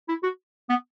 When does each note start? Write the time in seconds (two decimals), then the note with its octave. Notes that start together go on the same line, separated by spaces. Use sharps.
0.09 E4
0.23 F#4
0.69 B3